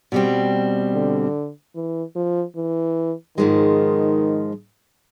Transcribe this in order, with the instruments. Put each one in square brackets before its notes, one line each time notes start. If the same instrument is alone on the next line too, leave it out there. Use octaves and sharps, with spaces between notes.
[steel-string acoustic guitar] B2 G3 C4
[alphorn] D3
E3
F3
E3
[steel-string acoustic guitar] G#2 F3 G#3 [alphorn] D#3